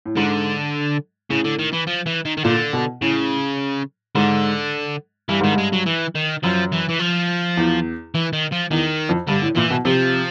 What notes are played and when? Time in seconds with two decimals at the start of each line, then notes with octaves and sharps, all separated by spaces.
0.06 A2
0.17 G#2 D3
1.30 A2 C#3
1.45 D3
1.59 D#3
1.73 E3
1.87 F3
2.07 E3
2.25 D#3
2.37 D#3
2.44 A#2 D3
2.73 B2
3.01 A2 C#3
4.15 G#2 D3
5.29 G2 E3
5.40 G#2 D#3
5.52 G2
5.58 G#3
5.73 F#3
5.86 E3
6.15 D#3
6.43 F#2 F3
6.72 E3
6.89 E3
7.00 F3
7.57 E2
8.15 E3
8.33 D#3
8.52 F3
8.71 E2 D#3
9.09 F2
9.28 G2 D3
9.42 A2
9.56 A#2 E3
9.71 B2
9.85 C3 F3